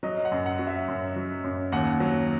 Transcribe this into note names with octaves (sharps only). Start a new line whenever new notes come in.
F#3 D#5
F#5
F#2
F#5
F#3
E5
F#2
F#3
F#2
D#2 F#5
F#3